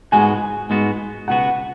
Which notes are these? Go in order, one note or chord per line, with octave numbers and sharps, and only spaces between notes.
G#2 G#3 B3 F#4 G#5
G#2 G#3 B3 F#4
C#2 B2 B3 F#4 F#5